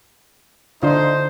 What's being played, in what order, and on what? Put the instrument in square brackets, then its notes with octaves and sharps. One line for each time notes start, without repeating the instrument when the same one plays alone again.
[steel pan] D3 D4 F4 [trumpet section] D#4 C5